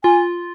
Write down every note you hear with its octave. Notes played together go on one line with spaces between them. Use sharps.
F4 G#5